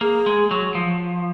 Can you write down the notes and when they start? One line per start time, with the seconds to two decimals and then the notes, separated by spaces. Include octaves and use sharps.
0.01 A#3 G#4
0.26 G#3
0.51 F#3
0.75 F3